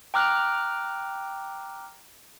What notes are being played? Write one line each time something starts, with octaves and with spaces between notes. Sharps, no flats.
G5 A#5 D6 F6 F#6